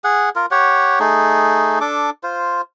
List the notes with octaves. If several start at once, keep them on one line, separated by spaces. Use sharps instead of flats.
G#4 F#5
F4 A#4
G4 C#5 F#5
A3 D#4 G#4
D4 A4 D6
F4 C5